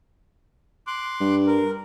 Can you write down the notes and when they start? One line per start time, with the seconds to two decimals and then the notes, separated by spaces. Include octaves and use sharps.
0.87 C6 D6 F#6
1.20 G2
1.47 A#4